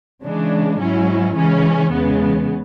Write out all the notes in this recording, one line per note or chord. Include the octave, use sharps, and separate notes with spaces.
C#3 E3 G#3 D4
G#2 F#3 C#4 E4
C#3 E3 G#3 C#4
E2 C#3 G#3 B3